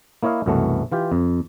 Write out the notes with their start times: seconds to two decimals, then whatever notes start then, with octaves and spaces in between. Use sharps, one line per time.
0.23 A#3 E4 C#5 D#5 F5
0.46 C2 F#2 B2 E3 F#3 A3
0.92 E3 F4 G4
1.12 F2